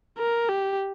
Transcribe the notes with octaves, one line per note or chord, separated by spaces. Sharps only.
A#4
G4